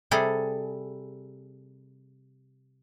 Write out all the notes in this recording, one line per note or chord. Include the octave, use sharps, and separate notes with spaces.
C3 G3 G#4 A4